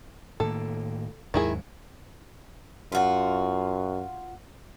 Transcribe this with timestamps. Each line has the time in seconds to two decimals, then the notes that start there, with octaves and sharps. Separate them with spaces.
0.40 A2 D#3 A#3 A4
1.34 D#2 G#2 D#3 F#3 E4 G#4
2.92 F#2 F4 F#4